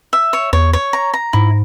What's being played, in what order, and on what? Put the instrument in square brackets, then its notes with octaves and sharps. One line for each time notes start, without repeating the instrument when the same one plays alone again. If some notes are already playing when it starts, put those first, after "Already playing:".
[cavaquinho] E5
C#5
[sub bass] E2 [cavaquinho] C#5
[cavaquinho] C#5
A#5
A#5
[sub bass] G#2 [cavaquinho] E4